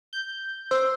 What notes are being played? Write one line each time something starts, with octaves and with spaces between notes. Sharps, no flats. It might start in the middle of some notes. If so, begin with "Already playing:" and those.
G6
C5 E6